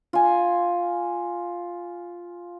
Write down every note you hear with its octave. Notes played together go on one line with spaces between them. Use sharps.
F4 G#5